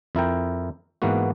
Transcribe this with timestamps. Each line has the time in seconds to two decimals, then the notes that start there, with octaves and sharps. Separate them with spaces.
0.15 F2 E4 A#4 G5
1.02 G#2 E3 A#3 B3 F#4